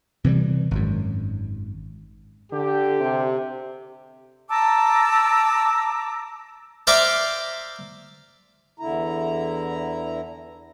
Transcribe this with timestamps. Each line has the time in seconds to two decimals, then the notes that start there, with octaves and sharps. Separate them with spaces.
0.24 C3 E3 F3 G3
0.71 G#1 F#2
2.52 D3 G4
3.01 C3
4.49 A5 A#5 D6 E6
6.87 C5 D5 E5 F5 A#5 D6
8.80 E2 D3 E4 A#5